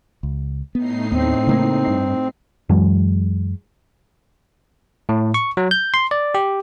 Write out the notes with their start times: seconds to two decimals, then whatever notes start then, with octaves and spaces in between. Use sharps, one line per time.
0.23 C#2
0.75 A2 B3 D#4 C7
1.11 D#2 B3 C4
1.47 C#3 A3 A#3
1.87 G2
2.69 F#2 E3 F#3 G#3
5.09 A2
5.34 C#6
5.57 F#3
5.71 G6
5.94 C6
6.11 D5
6.35 G4